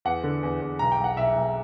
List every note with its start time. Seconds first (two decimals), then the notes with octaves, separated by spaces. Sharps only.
0.05 E2 F#5
0.23 D3
0.43 E2
0.61 E2
0.79 B1 A#5
0.92 G5
0.98 B1
1.04 F#5
1.17 B1 E5
1.36 B1